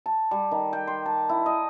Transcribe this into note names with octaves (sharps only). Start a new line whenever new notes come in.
A5
G3
D#3
G5
C6
A5
E4
D#5